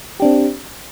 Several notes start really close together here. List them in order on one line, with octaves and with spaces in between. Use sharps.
G4 D4 C4